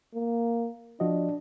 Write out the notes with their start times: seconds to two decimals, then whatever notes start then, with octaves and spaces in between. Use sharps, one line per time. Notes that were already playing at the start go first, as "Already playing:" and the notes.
0.14 A#3
1.00 F3 D4 F#4 D#5